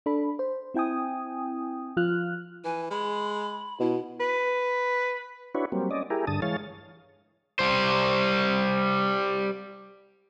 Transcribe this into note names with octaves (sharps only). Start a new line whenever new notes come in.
D4 A4 B5
C5
C4 E4 G5 G#5 D#6
F3 F4 F6 F#6
E3 G#5
G#3 B5
B2 E4
B4
D4 E4 F#4 B4 C#5
F#3 G3 A#3 C4
C#4 D5 D#5
E4 G4 G#4 A#4
G2 D3 A5 D#6
E3 G#3 C#5 F5 A6
G3 C5